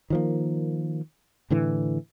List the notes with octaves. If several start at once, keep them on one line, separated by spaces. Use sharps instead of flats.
D#3 F3 A#3
A2 D3 E3